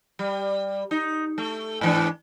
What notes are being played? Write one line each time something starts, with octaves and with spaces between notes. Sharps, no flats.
G3
D#4
A3
G#2 E3 D4